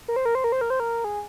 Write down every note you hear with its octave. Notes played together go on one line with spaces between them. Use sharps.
A#4
C5
A#4
C5
A#4
C5
A#4
C5
A#4
G#4